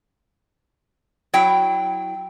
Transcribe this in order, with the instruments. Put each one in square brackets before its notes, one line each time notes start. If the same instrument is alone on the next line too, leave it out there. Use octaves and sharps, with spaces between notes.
[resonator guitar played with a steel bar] F#3 E4 G5